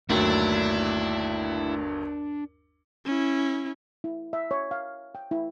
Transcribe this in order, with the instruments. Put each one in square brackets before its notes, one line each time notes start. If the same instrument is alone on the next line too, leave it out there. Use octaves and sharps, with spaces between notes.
[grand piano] G1 D#2 F#3 [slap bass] A3 [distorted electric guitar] D4 [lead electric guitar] E4
[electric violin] C#4 E4
[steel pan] E4
E5
C#5
F5
G5
E4